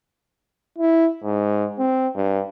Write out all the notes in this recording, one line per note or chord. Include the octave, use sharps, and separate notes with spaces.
E4
G#2
C4
G2